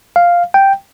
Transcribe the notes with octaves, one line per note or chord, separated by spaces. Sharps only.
F5
G5